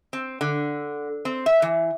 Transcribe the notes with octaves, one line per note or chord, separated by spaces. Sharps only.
C4
D3
C4
E5
E3